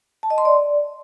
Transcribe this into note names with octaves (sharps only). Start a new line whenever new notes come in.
A5
D#5
C6
D5